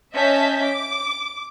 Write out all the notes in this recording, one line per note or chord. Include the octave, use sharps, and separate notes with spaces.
C#4 D#5 E5 A5 G6 B6
D6